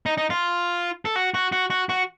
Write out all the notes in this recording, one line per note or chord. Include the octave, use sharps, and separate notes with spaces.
D#4
D#4
F4
A4
F#4
F#4
F#4
F#4
F#4